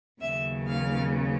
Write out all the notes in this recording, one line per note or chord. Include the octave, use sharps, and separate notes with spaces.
D#2 C#3 F#3 B3 E5
F5